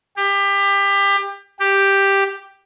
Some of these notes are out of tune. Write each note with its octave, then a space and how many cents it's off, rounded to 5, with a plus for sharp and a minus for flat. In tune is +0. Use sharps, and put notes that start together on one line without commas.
G4 +25
G4 +5